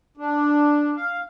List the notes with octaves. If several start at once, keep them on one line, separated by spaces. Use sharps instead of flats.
D4
F5